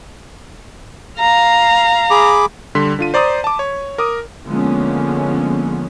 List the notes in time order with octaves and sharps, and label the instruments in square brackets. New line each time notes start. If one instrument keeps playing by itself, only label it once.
[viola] F5 A#5
[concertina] G#4 B5 D6
[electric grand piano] D3 G3 C6 B6
D3 F4 D#7
C5 D5 A#5 C6 D#6
A5 D6
C#5
A#4 D6 D#6
[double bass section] D3 F3 G#3 A#3 B3 C#4